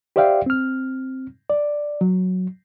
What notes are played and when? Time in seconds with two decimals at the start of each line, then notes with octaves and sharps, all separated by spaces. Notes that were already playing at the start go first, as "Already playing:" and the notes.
0.16 G4 C5 D5 E5 F5 G5
0.46 C4 F6
1.50 D5
2.01 F#3